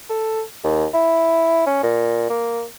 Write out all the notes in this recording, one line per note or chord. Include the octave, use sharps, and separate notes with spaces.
A4
D#2
E4
C#4
A#2
A#3